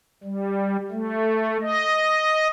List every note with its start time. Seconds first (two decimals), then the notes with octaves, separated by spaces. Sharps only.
0.24 G3
0.91 A3
1.62 D#5